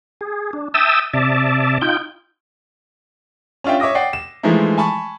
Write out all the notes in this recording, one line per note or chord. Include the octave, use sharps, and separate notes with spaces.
G#4
D4
E5 G5 A5 D#6 E6
C3 D5 E5 A5
D#4 F4 G5 G6
C#4 D4 F4 E5 G5
C#5 E5 D6 D#6 A#6
D5 F#5 G5 C7
E7
E3 F3 G#3 A3 D#4 E4
G#5 A5 B5 C#6